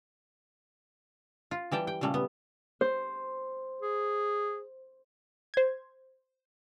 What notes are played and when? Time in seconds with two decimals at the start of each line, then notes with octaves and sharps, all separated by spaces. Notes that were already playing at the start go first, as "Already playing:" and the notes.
1.51 F4
1.72 E3 G3 G5 A5
1.87 G5
2.01 A#2 C#3 G3 A3
2.14 B3
2.81 C5
3.82 G#4
5.54 C5 G#6